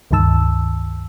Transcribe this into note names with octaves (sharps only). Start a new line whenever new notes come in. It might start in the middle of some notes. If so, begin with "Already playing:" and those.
C#2 G2 D#3 A5 E6